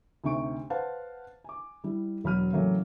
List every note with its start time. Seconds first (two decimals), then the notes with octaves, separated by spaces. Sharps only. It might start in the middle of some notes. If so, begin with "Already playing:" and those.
0.24 D2 C3 D#4 C#6 D7
0.70 B4 C5 F5 F#5 A5
1.44 G#5 D6
1.84 G3 E4
2.24 E1 F#3 B5 F6 D#7
2.53 A2 C#3 E3 F#3 A3 A#3